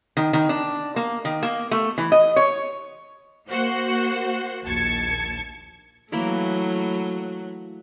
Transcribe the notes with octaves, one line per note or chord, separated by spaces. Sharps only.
D#3
D#3
D4
A#3
D#3
A#3
A3
E3
D#5
C#5
A#3 F#4 C5 F#5
A#1 D#2 A5 G#6 C#7
E3 F#3 A3 A#3 E4